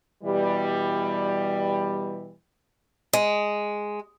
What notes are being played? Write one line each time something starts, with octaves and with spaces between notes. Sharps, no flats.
B2 E3 G3
G#3